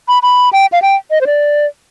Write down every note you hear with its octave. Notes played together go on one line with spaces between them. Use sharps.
B5
B5
G5
F5
G5
D#5
C5
D5